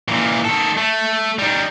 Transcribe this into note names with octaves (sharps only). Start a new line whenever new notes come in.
A#2 E3
D#3 A4
A3
G3 D#4